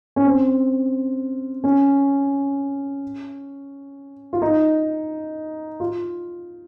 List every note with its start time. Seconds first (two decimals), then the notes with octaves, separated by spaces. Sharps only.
0.16 C#4
0.26 C4
1.64 C#4
4.33 F4
4.42 D#4
5.80 F4